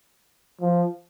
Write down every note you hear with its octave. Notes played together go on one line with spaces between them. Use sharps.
F3